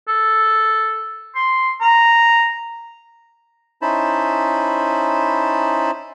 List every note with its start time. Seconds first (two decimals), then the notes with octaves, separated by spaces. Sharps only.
0.08 A4
1.35 C6
1.81 A#5
3.82 C#4 D#4 E4 C5 A5 B5